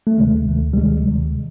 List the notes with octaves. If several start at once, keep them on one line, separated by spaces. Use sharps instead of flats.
A3
D2 C3 D#3 G#3
D2 C3 D#3
G3
D2 C3 D#3 G#3
D2 C3 D#3